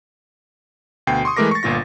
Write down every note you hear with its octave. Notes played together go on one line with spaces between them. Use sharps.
D2 B2 G5 C7
C6 C#6 D#6
E3 G#3 A3 A#4 D6 A#6
C#6 A6
G1 A#2 F4 A#6